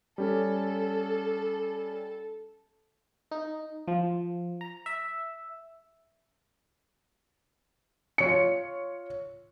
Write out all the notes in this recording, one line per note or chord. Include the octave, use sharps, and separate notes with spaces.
G3 C#4 A4
D#4
F3
A#5
E5
F4 C#5 C#7